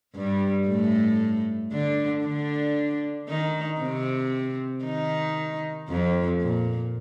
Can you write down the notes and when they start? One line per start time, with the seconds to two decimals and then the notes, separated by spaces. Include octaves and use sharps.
0.15 G2 G3
0.68 A2 A3
1.72 D3 D4
2.23 D3 D4
3.29 D#3 D#4
3.80 C3 C4
4.84 D#3 D#4
5.88 F2 F3
6.41 A#2